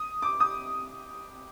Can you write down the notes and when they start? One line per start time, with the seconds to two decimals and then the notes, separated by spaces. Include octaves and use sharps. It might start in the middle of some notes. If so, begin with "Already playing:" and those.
Already playing: D#6
0.22 D6
0.40 D#6